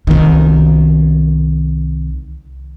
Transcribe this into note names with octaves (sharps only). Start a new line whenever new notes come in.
C2 D#3